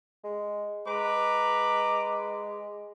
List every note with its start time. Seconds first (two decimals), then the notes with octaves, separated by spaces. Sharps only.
0.24 G#3
0.87 G#3 B4 A#5 D6